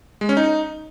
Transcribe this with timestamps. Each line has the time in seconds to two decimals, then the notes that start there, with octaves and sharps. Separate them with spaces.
0.21 G#3
0.29 C#4
0.37 D#4